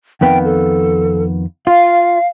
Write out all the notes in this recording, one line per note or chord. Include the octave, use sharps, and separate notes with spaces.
F2 D#3 B3 G5
A4
F4 F5